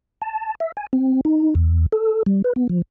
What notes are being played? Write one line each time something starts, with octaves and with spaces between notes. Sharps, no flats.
A5
E5
G#5
C4
D#4
E2
A4
G3
B4
B3
F3